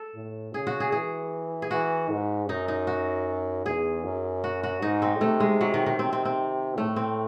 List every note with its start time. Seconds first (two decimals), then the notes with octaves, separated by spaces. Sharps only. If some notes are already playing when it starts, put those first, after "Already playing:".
Already playing: A4
0.15 A2
0.54 C#3 G#4
0.67 F#4
0.80 G#4
0.92 E3 G#4
1.62 G#4
1.71 E3 F#4
2.10 G#2
2.49 F#2 D#4
2.68 D#4
2.87 F#4
3.65 E2 G#4
4.04 F#2
4.44 F#4
4.63 F#4
4.82 G#2 D#4
5.02 C4
5.21 C3 A3
5.40 G#3
5.61 F#3
5.74 D#3
5.86 D#3
5.99 C3 C4
6.13 C4
6.25 C4
6.78 A2 A3
6.96 C4